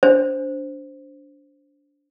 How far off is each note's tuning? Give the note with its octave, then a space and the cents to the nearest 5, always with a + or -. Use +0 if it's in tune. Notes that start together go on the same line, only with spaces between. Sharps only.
D4 -25 C5 +0